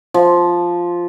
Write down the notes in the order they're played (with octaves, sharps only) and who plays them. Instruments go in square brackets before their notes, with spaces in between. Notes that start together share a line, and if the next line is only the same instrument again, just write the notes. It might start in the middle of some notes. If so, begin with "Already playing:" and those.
[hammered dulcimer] F3